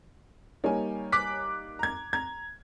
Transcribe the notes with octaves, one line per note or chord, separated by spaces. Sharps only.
G3 A#3 D#4 C#5 G#5
D6 F#6 B6
A#5 G#6
A#5 G#6